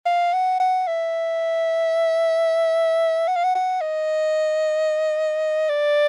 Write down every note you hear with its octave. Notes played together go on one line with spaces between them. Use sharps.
F5
F#5
F#5
E5
F#5
F5
F#5
F#5
D#5
D5